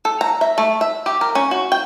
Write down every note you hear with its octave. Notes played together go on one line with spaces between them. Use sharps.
A4
A#5
E5
A3
E5
G4
A#4
C#4
F#4
G5